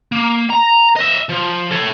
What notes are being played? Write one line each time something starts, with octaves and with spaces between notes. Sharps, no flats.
A#3
A#5
D#5 E5
F3
A4 C#5